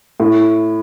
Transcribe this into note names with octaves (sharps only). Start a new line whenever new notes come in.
A2